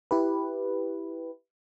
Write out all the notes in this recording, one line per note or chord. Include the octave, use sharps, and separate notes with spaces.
E4 G4 B4